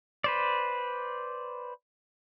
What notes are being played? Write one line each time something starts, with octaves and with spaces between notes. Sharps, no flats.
B4 C5 D5